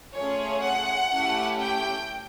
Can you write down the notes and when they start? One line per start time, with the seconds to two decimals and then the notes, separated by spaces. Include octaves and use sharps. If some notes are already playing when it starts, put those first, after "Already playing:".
0.15 A3 C#4 F4 G#4 C#5
0.64 F#5
1.12 A3 C#4 E4 G4
1.61 G5